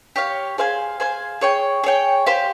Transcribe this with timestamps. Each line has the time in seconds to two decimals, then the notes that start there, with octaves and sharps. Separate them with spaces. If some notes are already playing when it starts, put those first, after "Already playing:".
0.16 G4 C#5 F5
0.58 G#4 C5 F5 G#5
1.00 G#4 C5 F5 G#5
1.41 G#4 C#5 G5
1.84 G#4 C#5 G5
2.26 G4 C5 F5